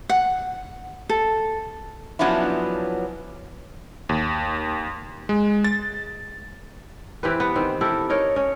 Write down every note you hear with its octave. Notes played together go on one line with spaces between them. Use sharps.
F#5
A4
F3 F#3 B3 C#4 D4 E4
D#2
G#3
A6
E3 C4 G4 B4
B3
D#3 C4
E4 G4 A4 A#4
D#4 A#4 C#5
C#4